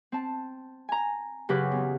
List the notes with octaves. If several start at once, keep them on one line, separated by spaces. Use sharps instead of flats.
C4 A5
G#5 A#5
F#2 C#3 G4 B4 D6 F#6
E2